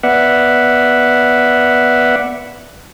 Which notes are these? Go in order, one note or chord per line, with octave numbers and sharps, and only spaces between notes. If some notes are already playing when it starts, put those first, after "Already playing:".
B3 D5 E5 F#5